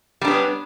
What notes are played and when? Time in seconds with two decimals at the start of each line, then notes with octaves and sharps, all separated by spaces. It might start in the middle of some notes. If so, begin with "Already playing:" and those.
0.21 G3
0.25 D4
0.28 B3
0.31 C#4